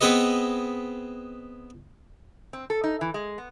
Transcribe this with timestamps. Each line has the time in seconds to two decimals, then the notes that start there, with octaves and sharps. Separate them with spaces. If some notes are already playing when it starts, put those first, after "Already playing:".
0.01 B3 C4 G#4 B4 D#5
2.53 C4
2.70 A4
2.84 D#4
3.01 E3
3.14 G#3
3.38 B3